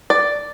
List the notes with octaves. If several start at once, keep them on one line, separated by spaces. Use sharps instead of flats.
D5